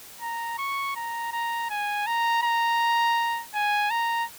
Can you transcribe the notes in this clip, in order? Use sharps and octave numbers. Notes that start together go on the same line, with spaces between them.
A#5
C#6
A#5
A#5
G#5
A#5
A#5
G#5
A#5